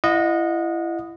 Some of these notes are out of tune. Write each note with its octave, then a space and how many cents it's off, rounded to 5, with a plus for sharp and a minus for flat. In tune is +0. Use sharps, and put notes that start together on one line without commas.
E4 +30 D#5 -10 F#5 -30